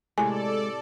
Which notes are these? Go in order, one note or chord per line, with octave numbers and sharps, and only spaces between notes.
A2 C3 G#3 A4 C#5 D5 G#5